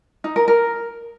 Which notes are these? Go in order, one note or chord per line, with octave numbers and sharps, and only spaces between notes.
D#4
A#4
A#4